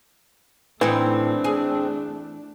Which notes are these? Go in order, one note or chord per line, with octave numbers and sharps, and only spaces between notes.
A2 E3 A3 C4 D4 D#4
G#4